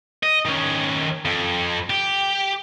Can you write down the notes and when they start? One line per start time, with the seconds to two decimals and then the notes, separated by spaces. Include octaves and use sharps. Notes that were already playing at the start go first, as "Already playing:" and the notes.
0.23 D#5
0.45 D#3 C#4
1.25 F2
1.90 G4